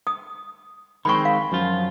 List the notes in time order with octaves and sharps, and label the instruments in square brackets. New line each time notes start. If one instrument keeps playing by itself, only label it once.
[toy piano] D#6
[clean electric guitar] D#3 G#3 C4 [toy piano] B5 C#6
[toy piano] F5
[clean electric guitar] F#2 F3 F4